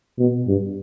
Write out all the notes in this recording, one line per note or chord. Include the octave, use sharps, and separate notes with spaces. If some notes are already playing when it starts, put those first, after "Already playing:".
B2
G2